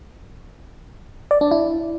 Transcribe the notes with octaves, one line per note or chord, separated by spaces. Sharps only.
D5
D4
E4